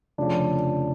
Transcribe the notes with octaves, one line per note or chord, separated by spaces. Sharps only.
F1 F2 C#3 D4